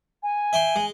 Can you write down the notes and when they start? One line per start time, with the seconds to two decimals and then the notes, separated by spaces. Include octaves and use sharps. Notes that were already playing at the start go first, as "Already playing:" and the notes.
0.23 G#5
0.53 E5 G5 C6
0.76 G#3